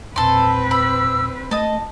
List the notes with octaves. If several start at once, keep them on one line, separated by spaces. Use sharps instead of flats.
E2 A#2 C4 A4 B4 C6
B5 E6
A3 D#5 A5 D#6